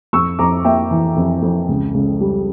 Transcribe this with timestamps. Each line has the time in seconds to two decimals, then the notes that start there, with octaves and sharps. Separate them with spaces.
0.13 F2 C#6 E6
0.39 F2 A#5 D6
0.64 A#3 E5 G5
0.91 E3
1.16 F2
1.42 F2
1.68 C#2
1.94 C#2
2.20 G3